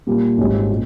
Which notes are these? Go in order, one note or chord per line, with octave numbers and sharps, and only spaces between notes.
A#2 G3 A#3
G#1 G#2 G3 C#4
A#2